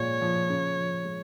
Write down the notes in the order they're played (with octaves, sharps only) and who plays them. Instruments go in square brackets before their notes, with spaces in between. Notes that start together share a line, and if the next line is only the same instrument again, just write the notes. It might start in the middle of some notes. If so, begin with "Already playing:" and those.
Already playing: [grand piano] A#2 F3 G#3 F4 [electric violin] C#5
[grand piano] F3
C#3
F3
G#3